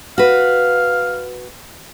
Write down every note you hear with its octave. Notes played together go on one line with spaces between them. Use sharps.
F#4 B4 F5